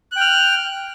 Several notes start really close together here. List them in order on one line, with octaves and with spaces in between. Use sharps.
F#6 G5 F6